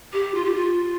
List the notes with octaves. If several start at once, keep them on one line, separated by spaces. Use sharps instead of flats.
G4
F4
G4
F4